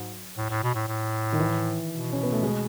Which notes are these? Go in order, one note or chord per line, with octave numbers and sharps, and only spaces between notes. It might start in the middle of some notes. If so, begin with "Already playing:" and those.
Already playing: G#2 F#3
A2
A2
B2
A2
A2
D#3
E3
B2
C#4
B3
A3
G#3